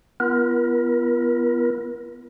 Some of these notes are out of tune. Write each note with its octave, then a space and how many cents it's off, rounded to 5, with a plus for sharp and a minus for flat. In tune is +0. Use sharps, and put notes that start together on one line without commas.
B3 +0 F4 -40 A#4 +35